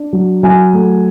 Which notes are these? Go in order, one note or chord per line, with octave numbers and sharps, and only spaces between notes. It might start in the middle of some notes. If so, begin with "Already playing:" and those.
Already playing: D4
F#3
F#3 G#5
A3